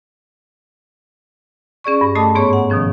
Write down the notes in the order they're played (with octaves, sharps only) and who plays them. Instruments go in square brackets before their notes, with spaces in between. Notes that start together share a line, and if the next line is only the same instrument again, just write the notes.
[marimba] C#4 G#4 D5 C#6
G2
A3 A4 D#5 A5 D6 D#6
G#2 B3 G#4 C#5 C#6
F#5
B2 D#3 F3 C#4